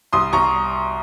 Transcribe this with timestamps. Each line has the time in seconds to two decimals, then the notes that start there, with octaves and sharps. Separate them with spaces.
0.13 C2 C6 D#6
0.33 C2 A#5 C#6